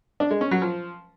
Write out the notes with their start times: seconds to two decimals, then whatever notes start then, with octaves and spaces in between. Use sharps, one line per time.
0.20 D4
0.31 G#3
0.41 C#4
0.51 F#3
0.62 F3